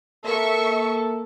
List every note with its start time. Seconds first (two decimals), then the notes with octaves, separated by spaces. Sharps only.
0.24 A#3 A4 A#4 E5 C#6